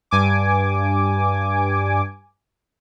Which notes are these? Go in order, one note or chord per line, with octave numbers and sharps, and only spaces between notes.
G2 G#5 D6